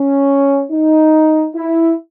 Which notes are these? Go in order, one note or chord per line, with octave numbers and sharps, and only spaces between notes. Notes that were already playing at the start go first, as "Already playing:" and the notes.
Already playing: C#4
D#4
E4